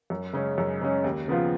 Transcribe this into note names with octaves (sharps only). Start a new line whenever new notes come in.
F#2
C#3 G#3 C#4
F#2
C#3 G#3 C#4
D#2
C#3 F3 B3 F4